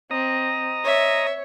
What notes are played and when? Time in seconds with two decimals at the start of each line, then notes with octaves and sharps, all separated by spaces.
0.11 C4 D#5 A#5
0.84 C#5 E5